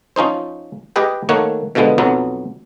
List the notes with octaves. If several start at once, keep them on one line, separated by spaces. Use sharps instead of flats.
F3 C#4 D#4 C5
G4 G#4 B4 D#5 G5
D#3 A3 A#3 C#5 F#5
B2 D3 F3 G#3 B3
B1 F2 F#3 B3